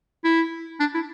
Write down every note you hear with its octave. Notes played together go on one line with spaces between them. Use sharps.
E4
D4
E4